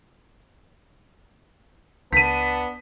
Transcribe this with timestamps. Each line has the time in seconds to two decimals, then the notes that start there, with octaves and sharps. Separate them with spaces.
2.13 C#2 B3 D4 A5 B6 D#7